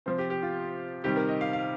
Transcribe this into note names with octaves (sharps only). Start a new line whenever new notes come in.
C3 F3 C4 C5
G4
G4
F4
C3 D#3 G3 G4
A#4
D#5
F5
F5